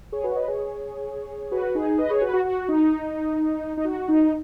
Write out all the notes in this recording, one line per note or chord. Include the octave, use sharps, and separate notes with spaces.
G#4 C#5
F#4 B4
C#5
B4 D#5
G#4 C#5
F#4 B4
D#4 G#4
B4 D#5
G#4 C#5
F#4 B4
F#4
F#4
D#4
D#4
F#4
D#4